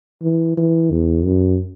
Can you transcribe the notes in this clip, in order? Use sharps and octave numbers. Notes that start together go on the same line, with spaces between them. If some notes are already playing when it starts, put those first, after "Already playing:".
E3
E3
E2
F#2